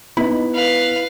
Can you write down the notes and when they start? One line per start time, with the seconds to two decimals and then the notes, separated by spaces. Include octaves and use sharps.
0.17 B3 D#4 E4 B5
0.54 B4 F5